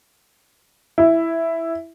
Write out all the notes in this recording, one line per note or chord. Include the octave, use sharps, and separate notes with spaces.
E4